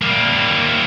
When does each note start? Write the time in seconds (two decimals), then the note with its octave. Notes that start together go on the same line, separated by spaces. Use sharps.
0.02 G3 A#3